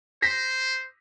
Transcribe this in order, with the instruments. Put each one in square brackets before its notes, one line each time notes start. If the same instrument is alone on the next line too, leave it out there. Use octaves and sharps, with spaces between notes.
[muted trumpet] C5 [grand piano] A#6 B6